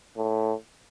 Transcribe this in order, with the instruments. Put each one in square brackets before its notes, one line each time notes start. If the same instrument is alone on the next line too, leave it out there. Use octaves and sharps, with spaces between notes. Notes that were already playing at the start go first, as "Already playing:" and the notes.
[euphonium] A2